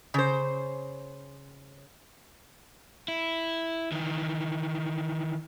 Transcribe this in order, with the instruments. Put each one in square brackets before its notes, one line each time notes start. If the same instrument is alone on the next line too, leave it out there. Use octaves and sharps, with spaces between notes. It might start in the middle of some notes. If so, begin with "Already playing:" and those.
[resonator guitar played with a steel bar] C#3 C5
[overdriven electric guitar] E4
D#3 E3